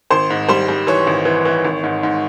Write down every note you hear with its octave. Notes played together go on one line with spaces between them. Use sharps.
G#1 C5 C6
G#2
G3 C5 C6
G3
E3 C#5 C#6
G#1
E3
E3
G#1
G#2
G#2